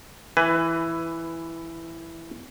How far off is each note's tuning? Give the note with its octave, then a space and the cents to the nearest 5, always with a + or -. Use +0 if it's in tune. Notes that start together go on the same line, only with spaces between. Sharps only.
E3 +5 B4 +20 G#5 +0